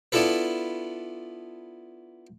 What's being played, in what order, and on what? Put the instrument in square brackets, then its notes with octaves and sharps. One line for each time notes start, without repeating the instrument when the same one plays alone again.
[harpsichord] B3 D4 E4 F4 A4 B4